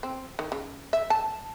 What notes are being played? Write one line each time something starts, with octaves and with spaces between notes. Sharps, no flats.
C4
D#3
C#3
E5
A5